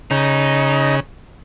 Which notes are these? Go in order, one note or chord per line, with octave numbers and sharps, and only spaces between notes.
C#3 D#4